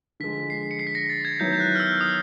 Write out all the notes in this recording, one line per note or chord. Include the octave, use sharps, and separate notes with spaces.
D3 F3 G#3 B6
C7
C#7
C7
B6
A#6
A6
G#6
D#3 F#3 B3 E4 G6
G6
F#6
F6
E6
D#6